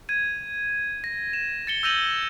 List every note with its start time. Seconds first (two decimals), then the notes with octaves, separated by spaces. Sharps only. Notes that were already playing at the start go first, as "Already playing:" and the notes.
0.09 G#6 D#7
1.04 A#6
1.33 E7
1.67 A6 C#7 G7
1.83 E6 G6 A#6 D#7 F7 F#7